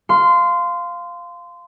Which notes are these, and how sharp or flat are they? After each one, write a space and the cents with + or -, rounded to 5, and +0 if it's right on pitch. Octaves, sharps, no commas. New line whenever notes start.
F5 +0 C6 -20